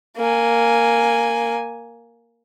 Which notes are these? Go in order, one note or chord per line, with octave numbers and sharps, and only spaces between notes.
A#3 G#5